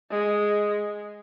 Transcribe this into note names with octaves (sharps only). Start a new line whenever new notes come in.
G#3